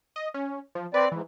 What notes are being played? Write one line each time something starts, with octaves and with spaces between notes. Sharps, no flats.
D#5
C#4
F3
C4 B4 D5
G#2 E3